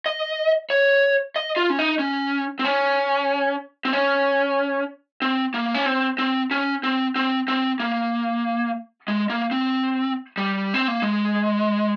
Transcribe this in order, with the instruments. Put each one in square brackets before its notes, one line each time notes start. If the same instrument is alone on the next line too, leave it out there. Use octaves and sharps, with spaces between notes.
[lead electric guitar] D#5
C#5
D#5
F4
C#4
D#4
C#4
C4
C#4
C4
C#4
C4
A#3
C#4
C4
C4
C#4
C4
C4
C4
A#3
G#3
A#3
C4
G3
C4
A#3
G#3